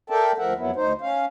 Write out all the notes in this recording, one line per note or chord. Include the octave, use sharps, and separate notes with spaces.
A4 A#4 D5 E5 G5 A5
D2 F3 A#4 E5 F#5
F2 F#3 B3 E4
D2 D#4 C5
C#4 F5